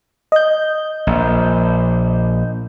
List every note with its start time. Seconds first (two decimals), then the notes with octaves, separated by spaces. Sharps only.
0.32 D#5 G6
1.07 A#1